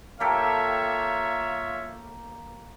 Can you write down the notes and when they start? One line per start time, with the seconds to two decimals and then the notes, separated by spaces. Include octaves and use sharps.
0.20 A#3 F4 G4 A4 C#5 E5